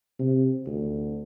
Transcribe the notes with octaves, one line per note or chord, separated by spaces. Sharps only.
C3
D2